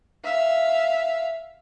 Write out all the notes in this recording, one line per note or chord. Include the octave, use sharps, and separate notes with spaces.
E5 F5